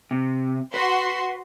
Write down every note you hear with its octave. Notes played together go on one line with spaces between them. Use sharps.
C3
F#4 B4 C6